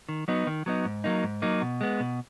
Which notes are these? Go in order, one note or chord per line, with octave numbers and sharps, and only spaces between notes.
D#3
F#3 B3 D#4
D#3
F#3 B3 D#4
G#2
F#3 A#3 D#4
G#2
F#3 A#3 D#4
B2
G#3 B3
B2